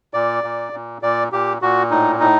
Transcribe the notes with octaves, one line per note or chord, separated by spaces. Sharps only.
A#2 D5
A#2
A#2
A#2 D5
A#2 G4
A#2 F#4
A2 D#4
A2 D#4